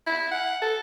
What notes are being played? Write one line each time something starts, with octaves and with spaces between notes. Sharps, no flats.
E4
F#5
A4